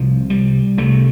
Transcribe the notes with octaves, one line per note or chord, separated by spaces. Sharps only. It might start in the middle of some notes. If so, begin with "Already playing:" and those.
Already playing: C2 C3 F3
G3
C2 C3 A3